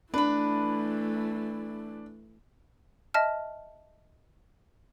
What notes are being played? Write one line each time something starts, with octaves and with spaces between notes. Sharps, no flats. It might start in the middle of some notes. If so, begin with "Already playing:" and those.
E3 A3 D4 B4 B5
D#5 E5 A5 F6